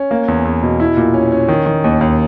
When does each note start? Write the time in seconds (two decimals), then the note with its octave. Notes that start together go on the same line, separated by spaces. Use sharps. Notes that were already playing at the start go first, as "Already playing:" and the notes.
Already playing: C#4
0.11 A#3
0.28 E2
0.45 E2
0.63 B2
0.80 E4
0.97 A#2
1.14 C#4
1.32 C#4
1.48 D#3
1.66 D#3
1.84 D#2
2.01 D#2